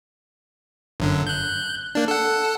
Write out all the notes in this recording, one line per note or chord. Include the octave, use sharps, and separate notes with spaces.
G1 F#2 D3
F#6 G6
A#3 D4
A4 F#5